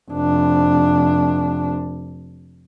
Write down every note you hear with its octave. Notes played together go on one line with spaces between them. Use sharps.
F1 D4